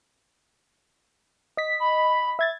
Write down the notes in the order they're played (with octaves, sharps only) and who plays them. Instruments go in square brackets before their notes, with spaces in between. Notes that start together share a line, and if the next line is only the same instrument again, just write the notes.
[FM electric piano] D#5 B6
[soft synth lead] B5
[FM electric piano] E5 G#6 A6